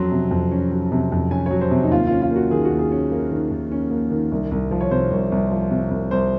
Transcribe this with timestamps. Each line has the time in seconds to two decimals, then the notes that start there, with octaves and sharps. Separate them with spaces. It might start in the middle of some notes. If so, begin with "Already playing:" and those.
Already playing: F2 F#3 C#4 C6
0.12 C3
0.31 F2
0.51 C#4
0.72 F#3
0.92 C3
1.12 F2
1.31 C#4 G#5
1.46 F#3 C#5
1.61 C5
1.71 C3
1.84 D#4
1.91 D#2 F4
2.07 C#4 F4
2.22 F4
2.31 A#3 F#4
2.51 D#3 G#4
2.65 F#4
2.71 D#2
2.79 G#4
2.92 C#4
3.11 A#3
3.31 D#3
3.51 D#2
3.71 C#4
3.91 A#3
4.11 D#3
4.32 C2
4.51 C2
4.71 F3
4.81 C#5
4.91 C3 C5
5.11 C2
5.32 C2
5.51 F3
5.71 C3
5.91 C2
6.11 C2 C5